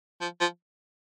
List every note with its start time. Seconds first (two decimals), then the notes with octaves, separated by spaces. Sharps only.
0.21 F3
0.41 F3